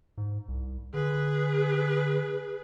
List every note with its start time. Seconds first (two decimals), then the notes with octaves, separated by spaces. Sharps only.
0.18 G#2
0.49 C2
0.94 D3 G#4 B4